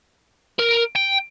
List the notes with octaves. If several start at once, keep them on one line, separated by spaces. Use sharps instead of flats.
A#4
G5